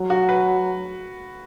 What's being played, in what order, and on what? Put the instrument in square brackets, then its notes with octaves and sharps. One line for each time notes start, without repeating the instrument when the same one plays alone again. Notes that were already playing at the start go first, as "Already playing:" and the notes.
Already playing: [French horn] F#3
[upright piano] F#4
B4